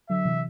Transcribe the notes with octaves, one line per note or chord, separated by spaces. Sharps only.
D3 F#3 E5
C3 E3